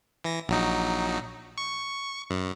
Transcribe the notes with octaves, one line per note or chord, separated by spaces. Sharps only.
E3 A#6
A#1 F#3 D#4
C#6
F#2